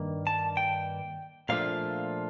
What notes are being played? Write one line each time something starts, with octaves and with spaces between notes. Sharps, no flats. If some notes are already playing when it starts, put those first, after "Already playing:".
Already playing: G2 D#3 A#3
A5
G5
A#2 F3 A3 D4 F4 F5